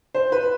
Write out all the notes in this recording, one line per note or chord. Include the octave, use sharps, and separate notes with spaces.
C5
B4